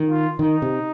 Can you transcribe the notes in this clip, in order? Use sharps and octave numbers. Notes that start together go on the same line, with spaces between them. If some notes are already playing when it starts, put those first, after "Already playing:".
Already playing: D#3
F4
D#3 D#4
C3